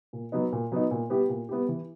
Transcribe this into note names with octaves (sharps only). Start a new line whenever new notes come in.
A#2
F#3 B3 D#4
A#2
F#3 B3 D#4
A#2
G3 B3 E4 G4
A#2
G3 B3 E4 G4
E3